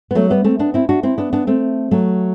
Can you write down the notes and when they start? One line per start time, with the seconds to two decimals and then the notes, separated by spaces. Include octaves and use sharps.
0.11 B3
0.15 F#3 A3
0.30 G3 B3
0.44 A3 C4
0.59 B3 D4
0.74 C4 E4
0.89 D4 F#4
1.03 C4 E4
1.18 B3 D4
1.33 B3 D4
1.47 A3 C4
1.91 F#3 A3